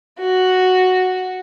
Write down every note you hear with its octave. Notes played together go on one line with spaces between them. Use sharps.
F#4